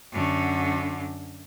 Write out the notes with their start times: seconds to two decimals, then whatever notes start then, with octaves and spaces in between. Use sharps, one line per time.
0.12 F#2 D3